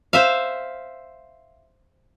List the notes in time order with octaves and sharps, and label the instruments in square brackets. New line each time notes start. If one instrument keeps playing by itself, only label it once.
[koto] C5 E5 F5